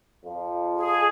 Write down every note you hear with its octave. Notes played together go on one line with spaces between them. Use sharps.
F2 F3 F4
G#4